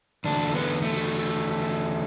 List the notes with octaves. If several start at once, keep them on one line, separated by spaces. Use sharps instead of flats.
E2 D3 A3 D4
B3
A3